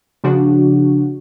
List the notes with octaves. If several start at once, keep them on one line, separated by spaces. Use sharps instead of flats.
C#3 F3 D4 F#4